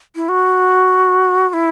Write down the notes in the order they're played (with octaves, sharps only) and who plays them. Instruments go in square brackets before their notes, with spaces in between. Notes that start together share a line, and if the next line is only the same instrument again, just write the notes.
[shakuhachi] E4
F#4
F#4
E4